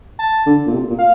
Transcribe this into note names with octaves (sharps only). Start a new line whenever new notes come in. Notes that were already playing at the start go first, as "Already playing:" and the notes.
A5
D3
A#2
C3
A#2
F5